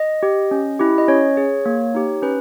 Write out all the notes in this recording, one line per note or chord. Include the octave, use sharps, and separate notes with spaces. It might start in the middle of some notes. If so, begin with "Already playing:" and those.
Already playing: D#5
G4
C#4
E4 G4
D#5
C#4 C#5
G#4
A#3
D#4 G4
C#4 B4